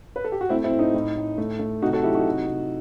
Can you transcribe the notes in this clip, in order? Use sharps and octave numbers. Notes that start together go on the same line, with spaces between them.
B4
A4
G4
F#4
A3 C4 E4
C4 E4
A2
D#4
A2
A2
A3
A3
C3 D#4 F#4
F#4 A4
F#3 E4 G4
D#4 F#4
C3
C3